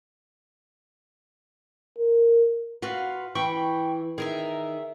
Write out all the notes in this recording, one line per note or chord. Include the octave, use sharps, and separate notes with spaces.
A#4
F4 F#4 B4 F5
E3 G5 B5 C#6
D#3 G#4 A#4 E5